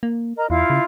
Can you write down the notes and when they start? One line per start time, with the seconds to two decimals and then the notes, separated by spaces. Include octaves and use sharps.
0.03 A#3
0.36 A#4 D#5 A#5
0.50 E2 E4 F4 F5
0.70 C#3